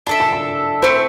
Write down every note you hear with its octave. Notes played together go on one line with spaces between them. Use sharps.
D4 A4 E5 A5
A5
A5
A3 C4 E4 C5